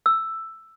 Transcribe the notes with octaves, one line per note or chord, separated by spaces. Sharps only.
E6